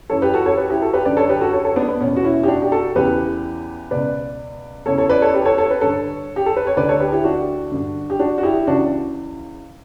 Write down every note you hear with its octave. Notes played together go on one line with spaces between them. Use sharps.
F#2 E3 A4 C#5
G4 B4
F#4 A4
A4 C#5
G4 B4
E4 G4
F#4 A4
G4 B4
F#2 D3 B4 D5
A4 C#5
G4 B4
F#4 A4
A4 C#5
A4 C#5
B3 D4
B3
E2 B2 C#4
F#4
C#4 E4
G4
D4 F#4
G4
F#4 A4
E2 C#3 E3 G4 B4
C#2 B2 B4 D5
E2 C#3 E3 A4 C#5
A4 C#5
B4 D5
A4 C#5
G4 B4
A4 C#5
A4 C#5
B4
G2 D3 A4 C#5
G4
A4
B4
C#5
D2 D3 B4 D5
A4 C#5
G4 B4
E4 G4
D4 F#4
G2 D3
G4
D4 F#4
F#4
E4 G4
C#2 C#3 E3 D4 F#4